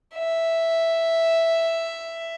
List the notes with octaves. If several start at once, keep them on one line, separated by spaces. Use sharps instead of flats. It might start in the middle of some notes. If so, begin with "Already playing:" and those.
E5